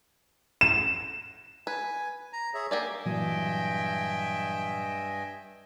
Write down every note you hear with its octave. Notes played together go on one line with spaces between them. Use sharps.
E7
B4 G#5
A#5
G#4 C#5 E5
A#3 G4 D5 G#5
G2 A#2 E3 F#3 D#5 E5 G5 G#5